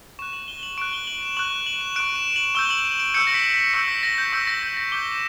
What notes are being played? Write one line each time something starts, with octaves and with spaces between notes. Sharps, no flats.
C#6 F#6 E7
F#7
G7
F#7
C#6 F#6 D7
G7
F#7
E7
C#6 F#6 F#7
F#7
E7
C#6 F#6 D7
E7
F#7
C#6 E6 G6 G7
F#7
E7
D7
C#6 E6 G6 C#7
A#6
B6
B6
C#6 E6 G6 C#7
B6
A#6
G6
C#6 E6 G6 B6
A#6
G6
A#6
D6 G6 G7
E7